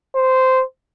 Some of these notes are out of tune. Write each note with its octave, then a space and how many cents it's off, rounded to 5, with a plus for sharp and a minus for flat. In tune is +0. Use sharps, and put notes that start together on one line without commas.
C5 -10